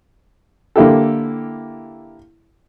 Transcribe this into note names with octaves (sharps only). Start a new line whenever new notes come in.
D3 A#3 E4 G4 A4